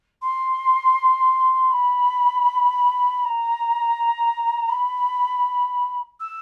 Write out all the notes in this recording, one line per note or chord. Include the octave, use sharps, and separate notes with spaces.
C6
B5
B5
A#5
B5
E6